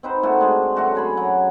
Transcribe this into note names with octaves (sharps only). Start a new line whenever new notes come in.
C4 D#4 B4 C5
A#2 A3 F#4
G#3 D4
F#2 A3 F#4 A5
C#3 G#4 B5
F#3